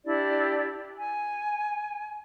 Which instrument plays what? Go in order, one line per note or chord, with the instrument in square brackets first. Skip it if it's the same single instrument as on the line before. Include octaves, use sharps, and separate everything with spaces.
[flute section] D4 E4 G4 D5
G#5